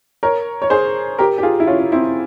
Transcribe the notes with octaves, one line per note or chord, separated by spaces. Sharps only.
A#4 C#5
C#5
G#4 C5
G4 A#4
G4
F4 G#4
E4
C#4 F4
C#4
C4 E4